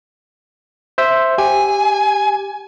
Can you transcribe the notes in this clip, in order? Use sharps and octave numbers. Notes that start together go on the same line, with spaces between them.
C5 E5
G4 G#5